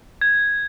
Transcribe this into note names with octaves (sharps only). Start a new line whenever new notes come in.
G#6